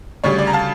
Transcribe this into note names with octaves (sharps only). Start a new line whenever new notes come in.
D2 C#3 G3 C#5
D5
A#5
F5 A5